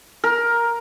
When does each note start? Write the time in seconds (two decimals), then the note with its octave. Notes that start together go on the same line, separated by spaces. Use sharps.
0.24 A#4